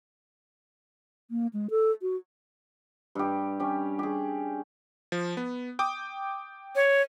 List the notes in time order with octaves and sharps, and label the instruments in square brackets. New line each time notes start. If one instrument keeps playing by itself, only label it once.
[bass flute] A#3
G#3
A4
F#4
[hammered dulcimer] G2 G4
C#4 G4
G4 G#4
[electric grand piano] F3
B3
G5 D6 D#6
[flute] C#5